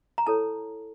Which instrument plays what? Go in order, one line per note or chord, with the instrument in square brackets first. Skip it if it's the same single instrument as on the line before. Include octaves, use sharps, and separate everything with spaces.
[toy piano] A#5
E4 A4 C#5 A5